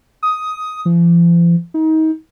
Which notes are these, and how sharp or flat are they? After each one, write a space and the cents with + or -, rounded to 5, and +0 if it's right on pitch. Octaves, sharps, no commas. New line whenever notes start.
D#6 +10
F3 -45
D#4 +30